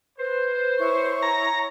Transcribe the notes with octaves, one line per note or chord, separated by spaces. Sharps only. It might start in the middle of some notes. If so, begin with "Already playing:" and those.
B4 C5
E4 C#5 C#6
A#5